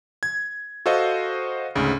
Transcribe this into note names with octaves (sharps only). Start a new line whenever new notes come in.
G#6
F#4 A4 C5 D#5 F5
D2 G#2 C#3